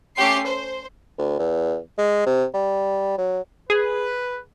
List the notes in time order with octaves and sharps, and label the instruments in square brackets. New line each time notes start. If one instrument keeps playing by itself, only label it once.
[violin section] A3 C#4 G4 C6 C7
C5
[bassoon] D2
E2
G#3
C3
G3
F#3
[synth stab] G#4 [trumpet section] B4